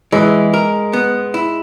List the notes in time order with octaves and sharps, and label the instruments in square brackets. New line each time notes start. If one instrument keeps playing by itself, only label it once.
[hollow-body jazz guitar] E3 [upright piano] G#3
[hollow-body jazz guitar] A#4
B3
E4